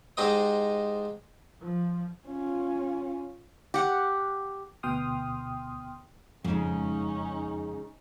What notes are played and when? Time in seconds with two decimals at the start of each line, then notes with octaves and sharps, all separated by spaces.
0.17 G#2 D#4 G4 C5 D#5 D#6
1.61 F3
2.27 C#4 F4
3.74 G4 F#5
4.83 D2 B2 G5 C6 D#6 F6
6.45 F2 G#2 C#3 C#4 D#4